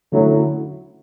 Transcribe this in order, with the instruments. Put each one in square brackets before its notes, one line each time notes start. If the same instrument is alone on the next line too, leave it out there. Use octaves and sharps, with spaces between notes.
[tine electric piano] D3 A3 C#4 E4 [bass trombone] F#3